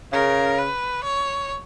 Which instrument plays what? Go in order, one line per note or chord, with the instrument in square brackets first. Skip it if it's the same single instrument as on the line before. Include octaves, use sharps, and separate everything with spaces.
[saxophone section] C#3 [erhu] A#4
[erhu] B4
C#5